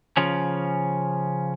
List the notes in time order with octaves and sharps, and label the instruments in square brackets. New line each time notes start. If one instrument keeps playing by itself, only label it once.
[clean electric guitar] C#3 F3 C#4